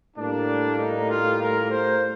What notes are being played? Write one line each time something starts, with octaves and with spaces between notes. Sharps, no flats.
A2 G3 A#3 D4
D#4
F4
A#4
C5